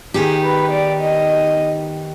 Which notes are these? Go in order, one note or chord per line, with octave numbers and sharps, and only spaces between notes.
D#3 B3 D#4 G4 G#4
B4
D5
D#5